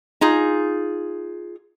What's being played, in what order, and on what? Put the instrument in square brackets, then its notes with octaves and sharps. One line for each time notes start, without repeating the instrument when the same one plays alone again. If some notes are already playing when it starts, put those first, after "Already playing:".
[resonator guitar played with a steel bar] D#4 F4 G#4